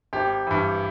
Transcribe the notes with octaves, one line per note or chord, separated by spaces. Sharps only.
G#1 G4
G2 E3